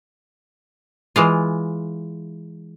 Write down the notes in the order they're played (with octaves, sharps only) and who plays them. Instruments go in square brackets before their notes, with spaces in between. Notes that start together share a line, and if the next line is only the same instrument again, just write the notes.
[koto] E3 G#3 F4